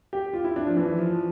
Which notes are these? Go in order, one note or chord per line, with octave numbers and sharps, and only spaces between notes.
G4
F4
E4
D4
F3
E3
F3